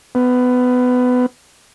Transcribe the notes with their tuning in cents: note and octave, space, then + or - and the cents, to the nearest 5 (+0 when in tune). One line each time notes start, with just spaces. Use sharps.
B3 +20